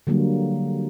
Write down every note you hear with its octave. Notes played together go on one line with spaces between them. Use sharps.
D3 F#3 G3 A#3